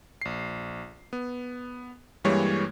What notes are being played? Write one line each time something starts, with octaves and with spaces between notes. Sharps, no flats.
A#1 C7
B3
G2 E3 G3 G#3 A#3 C#5